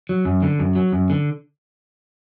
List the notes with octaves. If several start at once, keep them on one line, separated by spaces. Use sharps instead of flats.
F#3
F#2
D3
F#2
F#3
F#2
D3